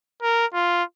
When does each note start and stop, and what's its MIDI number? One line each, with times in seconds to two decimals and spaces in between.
0.22 0.46 70
0.54 0.83 65